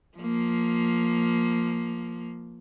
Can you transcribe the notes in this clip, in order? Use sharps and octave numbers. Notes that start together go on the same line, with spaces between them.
F3 A#3